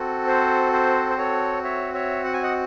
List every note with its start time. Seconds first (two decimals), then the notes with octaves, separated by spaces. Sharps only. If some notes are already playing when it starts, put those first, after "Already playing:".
Already playing: C4 F#4 A4
0.27 C5
0.73 C5
1.10 C5
1.18 A4 C#5
1.64 C#5 E5
1.94 C#5 E5
2.24 F#5
2.34 G#5
2.43 D#5 F#5